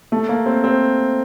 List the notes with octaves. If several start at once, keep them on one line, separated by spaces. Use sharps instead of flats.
A3
A#3
C4
C4